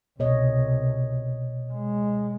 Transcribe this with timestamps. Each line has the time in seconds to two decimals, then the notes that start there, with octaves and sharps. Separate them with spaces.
0.20 C2 B2 C#5 D#5
1.73 G#3